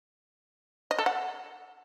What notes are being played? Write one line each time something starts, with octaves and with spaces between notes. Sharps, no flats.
D#5
A4
F#5